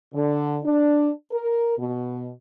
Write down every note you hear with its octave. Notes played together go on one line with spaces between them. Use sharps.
D3
D4
A#4
B2